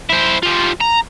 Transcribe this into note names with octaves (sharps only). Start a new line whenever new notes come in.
E4 C5
G3 F4
A#5